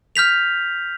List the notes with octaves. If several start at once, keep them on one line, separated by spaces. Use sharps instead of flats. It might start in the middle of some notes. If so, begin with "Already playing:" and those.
F6 G6 B6 F7